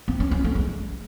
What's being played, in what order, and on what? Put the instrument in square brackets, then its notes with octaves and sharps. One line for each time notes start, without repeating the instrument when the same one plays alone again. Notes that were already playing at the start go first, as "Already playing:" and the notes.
[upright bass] C4
C#4
C#4
A3
G#3